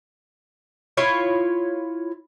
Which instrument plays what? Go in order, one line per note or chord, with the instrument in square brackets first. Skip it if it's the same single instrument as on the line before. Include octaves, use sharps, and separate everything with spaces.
[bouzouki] E4 F4 C#5